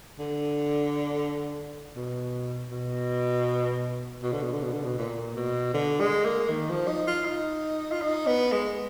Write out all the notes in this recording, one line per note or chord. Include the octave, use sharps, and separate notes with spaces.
D3
B2
B2
B2
D3
B2
D3
B2
D3
B2
A#2
B2
D3
G#3
A#3
D#3
F3
D#4
F4
D#4
F4
D#4
B3
G#3